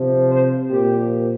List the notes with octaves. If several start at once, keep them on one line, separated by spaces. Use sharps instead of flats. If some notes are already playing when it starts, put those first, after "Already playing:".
Already playing: C3 F3
C5
A#2 F3 G4